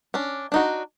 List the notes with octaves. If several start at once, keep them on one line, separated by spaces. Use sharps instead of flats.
C#4 D4
D4 D#4 F#4